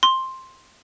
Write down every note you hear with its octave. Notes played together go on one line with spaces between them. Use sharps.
C6